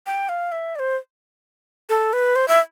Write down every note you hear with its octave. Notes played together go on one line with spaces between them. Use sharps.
G5
F5
E5
D5
C5
A4
B4
C5
E5